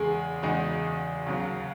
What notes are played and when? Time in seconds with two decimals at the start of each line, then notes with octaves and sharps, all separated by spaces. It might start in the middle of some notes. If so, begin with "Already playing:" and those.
Already playing: E2 C#3 G#3 G#4
0.43 E2 C#3 G#3 D#4 F#4
1.27 D#2 C#3 F#3